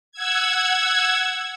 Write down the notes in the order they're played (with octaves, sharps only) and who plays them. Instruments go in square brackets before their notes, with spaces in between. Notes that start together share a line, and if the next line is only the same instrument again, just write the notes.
[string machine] F#5 E6 G#6